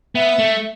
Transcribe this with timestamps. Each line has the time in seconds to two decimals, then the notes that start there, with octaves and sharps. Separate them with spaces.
0.15 B3 E5
0.39 A3